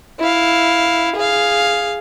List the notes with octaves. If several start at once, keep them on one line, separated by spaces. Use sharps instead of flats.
E4 F5
G#4 F5